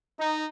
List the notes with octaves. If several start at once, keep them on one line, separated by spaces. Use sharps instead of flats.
D#4